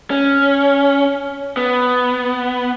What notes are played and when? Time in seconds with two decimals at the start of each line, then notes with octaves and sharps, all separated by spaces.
0.10 C#4
1.57 B3